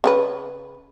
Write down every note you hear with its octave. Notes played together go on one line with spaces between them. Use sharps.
C#3 C4 B4